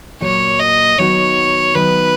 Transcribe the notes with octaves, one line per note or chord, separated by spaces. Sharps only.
A#2 F#3 A#3 C#5
D#5
D#3 F#3 B3 D#4 F#4 C#5
D#3 F#3 B3 D#4 B4